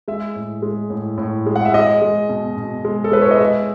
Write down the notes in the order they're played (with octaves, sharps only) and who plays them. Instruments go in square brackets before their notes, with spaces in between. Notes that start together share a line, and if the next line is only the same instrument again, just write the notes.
[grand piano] G#3 E5
A2
G#3
A2
A2
G#3
F#5
E5
G#3 D#5
G#3
B2
B2
G#3
A4
G#3 B4
C#5
D#5
G#3 E5